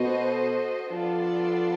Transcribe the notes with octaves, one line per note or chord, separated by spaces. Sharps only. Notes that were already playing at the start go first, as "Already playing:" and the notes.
Already playing: B2 F#4 A4 C5 D#5
F3 B3 D4 F4 A4 D5